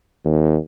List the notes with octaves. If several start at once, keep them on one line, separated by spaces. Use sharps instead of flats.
D#2